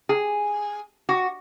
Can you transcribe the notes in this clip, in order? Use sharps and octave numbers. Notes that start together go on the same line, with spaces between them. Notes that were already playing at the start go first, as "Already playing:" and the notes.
G#4
F#4